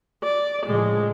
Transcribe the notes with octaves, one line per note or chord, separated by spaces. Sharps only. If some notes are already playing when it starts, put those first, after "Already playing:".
D5
A2 C#3 F3 G#3